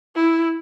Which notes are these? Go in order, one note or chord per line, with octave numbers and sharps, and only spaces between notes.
E4